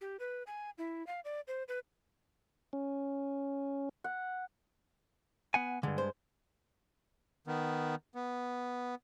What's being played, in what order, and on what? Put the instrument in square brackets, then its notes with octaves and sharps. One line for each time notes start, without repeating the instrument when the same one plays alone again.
[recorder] G4
B4
G#5
E4
F5
D5
C5
B4
[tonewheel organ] C#4
[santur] F#5
[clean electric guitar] B3 F#5 G#5
[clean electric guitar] G2 G#3 [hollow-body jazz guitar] D3
[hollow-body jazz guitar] C5
[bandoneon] D#3 B3
B3